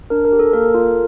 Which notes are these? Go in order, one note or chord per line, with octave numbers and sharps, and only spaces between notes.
D4 A#4
A#4
G4
A4
A#3 A#4
F4 A4